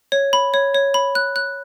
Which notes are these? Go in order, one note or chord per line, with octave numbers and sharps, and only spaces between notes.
C#5
B5
C#5
C#5
B5
F#6
F#6